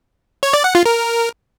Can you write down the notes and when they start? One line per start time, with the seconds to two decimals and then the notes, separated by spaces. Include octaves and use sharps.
0.43 C#5
0.53 D5
0.64 F#5
0.75 F4
0.86 A#4